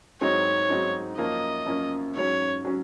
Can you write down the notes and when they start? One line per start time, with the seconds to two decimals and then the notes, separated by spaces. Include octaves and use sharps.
0.21 G#2 F#3 C4 D#4 C#5
0.70 G#2 F#3 C4 D#4
1.18 F#2 F3 A#3 C#4 D#5
1.66 F#2 F3 A#3 C#4
2.15 G#2 F#3 C#4 C#5
2.65 F#3 C#4